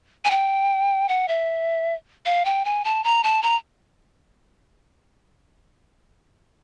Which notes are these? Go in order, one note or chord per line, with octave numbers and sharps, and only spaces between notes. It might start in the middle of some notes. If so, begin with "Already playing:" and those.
G#5
G5
F#5
E5
F5
G5
G#5
A5
A#5
A5
A#5